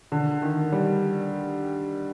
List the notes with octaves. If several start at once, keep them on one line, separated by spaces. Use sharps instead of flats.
D3
D#3
G3